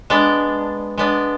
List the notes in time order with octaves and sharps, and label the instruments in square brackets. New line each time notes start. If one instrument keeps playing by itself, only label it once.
[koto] G#3 B3 D4
G#3 B3 D4